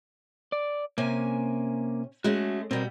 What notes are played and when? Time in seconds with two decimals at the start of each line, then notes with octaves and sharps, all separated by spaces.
0.52 D5
0.98 C3 A#3 C#4 G#5
2.24 G#3 A3 C#4 F#4
2.71 B2 G3 C4 A#4